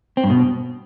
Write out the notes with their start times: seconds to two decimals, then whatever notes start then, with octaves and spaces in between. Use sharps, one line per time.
0.17 C4
0.24 G2
0.30 B2